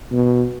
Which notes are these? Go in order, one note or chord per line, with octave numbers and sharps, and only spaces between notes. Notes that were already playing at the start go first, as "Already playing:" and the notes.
B2